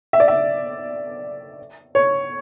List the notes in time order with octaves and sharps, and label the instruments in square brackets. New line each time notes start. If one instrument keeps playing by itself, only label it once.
[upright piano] E5
D5
E5
C#5